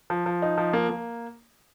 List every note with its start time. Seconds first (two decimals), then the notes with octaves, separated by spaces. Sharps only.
0.10 F3
0.26 F3
0.42 D#4
0.58 F3
0.73 A#3
0.90 A#3